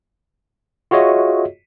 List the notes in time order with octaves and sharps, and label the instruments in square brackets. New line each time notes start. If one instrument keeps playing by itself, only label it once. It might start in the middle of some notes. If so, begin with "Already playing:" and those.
[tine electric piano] F4 F#4 G#4 C#5 D#5 E5